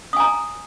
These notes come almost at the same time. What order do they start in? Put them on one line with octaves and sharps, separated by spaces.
D#6 G#5 A#5